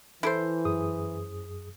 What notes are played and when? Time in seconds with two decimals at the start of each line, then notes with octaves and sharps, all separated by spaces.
0.23 E3 E4 A4 C5
0.65 F#2 G#4 D#6